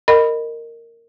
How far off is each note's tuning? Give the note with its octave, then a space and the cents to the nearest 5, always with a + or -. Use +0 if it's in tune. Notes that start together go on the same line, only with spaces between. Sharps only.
A#4 -15 D#5 -15 B5 +0